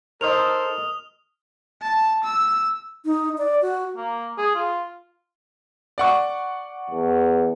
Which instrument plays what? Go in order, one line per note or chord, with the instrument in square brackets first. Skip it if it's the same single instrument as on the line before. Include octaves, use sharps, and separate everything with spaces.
[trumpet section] D#4 A4 C5 [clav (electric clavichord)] A#4 D#5 [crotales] D#6 F6 F7
[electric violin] A5
E6
[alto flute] D#4
D5
F#4
[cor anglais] A#3
G#4
F4
[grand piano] D5 F#5 C#6
[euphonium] E2